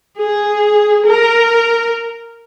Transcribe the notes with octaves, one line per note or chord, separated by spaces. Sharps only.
G#4
A#4